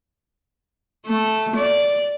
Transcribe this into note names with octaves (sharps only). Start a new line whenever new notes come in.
A3
D5